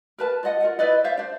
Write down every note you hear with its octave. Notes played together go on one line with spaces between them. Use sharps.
A#4 B4 A5
F4 D5 D#5 F#5
F4 A#4 F#5
E4 B4 D5 D#5
C5 D5 E5 F5
D4 C5